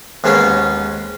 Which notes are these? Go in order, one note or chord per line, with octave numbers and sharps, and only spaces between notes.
D#2 G#2 G#3 B3 C#4 C6